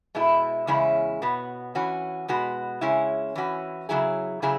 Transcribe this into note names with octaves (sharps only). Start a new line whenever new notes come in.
B2 G#3 E4
E2 C#3 G#3 C#4 E4
B2 B3 F#4
E3 C#4 F#4
B2 G#3 B3 F#4
C#3 G#3 C#4 E4
E3 C#4 F#4
C#3 F#3 E4 G#4
C#3 F#3 E4 G#4